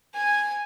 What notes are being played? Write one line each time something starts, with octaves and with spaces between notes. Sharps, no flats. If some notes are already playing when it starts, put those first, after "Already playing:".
G#5